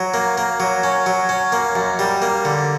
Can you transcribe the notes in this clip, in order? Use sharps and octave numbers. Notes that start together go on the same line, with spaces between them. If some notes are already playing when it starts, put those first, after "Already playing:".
Already playing: F#3
A#3
A#3
F#3
C#4
F#3
C#4
A#3
F#2
G3
A#3
D3